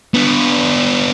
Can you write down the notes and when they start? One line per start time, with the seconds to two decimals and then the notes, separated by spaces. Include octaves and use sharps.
0.14 B3 D4